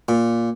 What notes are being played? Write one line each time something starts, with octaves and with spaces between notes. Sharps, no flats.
A#2